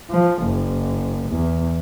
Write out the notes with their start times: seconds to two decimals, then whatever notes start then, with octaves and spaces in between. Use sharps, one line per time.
0.10 F3
0.44 F#1
1.29 E2